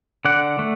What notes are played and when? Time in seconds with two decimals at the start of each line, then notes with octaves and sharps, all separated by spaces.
0.25 D3 D5 F#5
0.59 A3